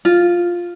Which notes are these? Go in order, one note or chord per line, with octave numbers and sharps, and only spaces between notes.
F4